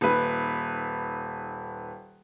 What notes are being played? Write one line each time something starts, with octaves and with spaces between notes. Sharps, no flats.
D#1 B4